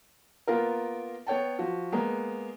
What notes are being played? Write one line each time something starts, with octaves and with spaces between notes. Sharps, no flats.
A#3 B3 F4 A#4
B3 C#5 G5 A5
F3 F#4
G#3 A#3 B3